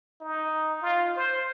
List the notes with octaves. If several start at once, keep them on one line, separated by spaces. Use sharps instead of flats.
D#4
F4
C5